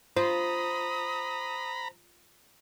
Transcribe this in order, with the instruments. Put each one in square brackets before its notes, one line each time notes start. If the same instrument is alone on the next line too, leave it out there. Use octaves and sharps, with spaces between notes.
[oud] F4 [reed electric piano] C5 [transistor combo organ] A#5 B5 [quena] D#6